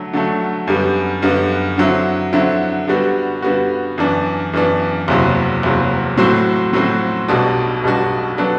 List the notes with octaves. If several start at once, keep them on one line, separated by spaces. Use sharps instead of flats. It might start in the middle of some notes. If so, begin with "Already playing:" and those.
Already playing: D3 F#3 A3
D3 F#3 A3
F#2 D3 G3 B3
F#2 D3 G3 B3
D3 F#3 C4 E4
D3 F#3 C4 E4
D3 G3 B3 F#4
D3 G3 B3 F#4
F#2 E3 B3 D4
F#2 E3 B3 D4
F#1 E2 C3 F#3
F#1 E2 C3 F#3
A2 F#3 C4 F#4 C5
A2 F#3 C4 F#4 C5
B1 B2 G3 D4 F#4
B1 B2 G3 D4 F#4
F#3 B3 D4 A4